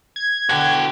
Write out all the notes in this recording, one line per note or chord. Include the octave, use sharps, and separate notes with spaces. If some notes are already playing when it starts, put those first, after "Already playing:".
G#6
B2 D3 F#4 G5